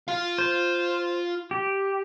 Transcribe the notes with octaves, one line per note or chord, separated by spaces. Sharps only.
F4 F5
C5
G4